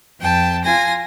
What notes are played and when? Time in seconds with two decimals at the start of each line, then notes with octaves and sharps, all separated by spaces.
0.19 F2 G5 A5
0.64 F4 G#5 A#6